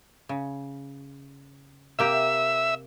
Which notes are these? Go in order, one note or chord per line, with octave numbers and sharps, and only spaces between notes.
C#3
C3 A#3 G4 E5 E6